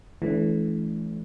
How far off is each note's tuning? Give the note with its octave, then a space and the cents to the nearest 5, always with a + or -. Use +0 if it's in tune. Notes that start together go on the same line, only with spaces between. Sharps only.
E3 +0 A3 -35 C#4 +45